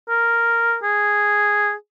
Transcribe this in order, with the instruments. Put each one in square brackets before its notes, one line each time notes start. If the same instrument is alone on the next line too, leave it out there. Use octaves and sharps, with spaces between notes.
[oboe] A#4
G#4